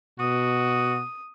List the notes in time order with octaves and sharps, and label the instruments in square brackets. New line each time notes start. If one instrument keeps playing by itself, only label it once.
[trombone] B2 [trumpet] F#4 [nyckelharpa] D#6